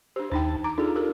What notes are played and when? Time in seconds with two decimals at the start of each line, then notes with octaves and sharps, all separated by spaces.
0.16 D4 G4 C5
0.32 D#2 D4 D#4 G5 A5
0.64 A#5 D6
0.78 D4 D#4 F4 G#4 A4
0.96 G4 A#4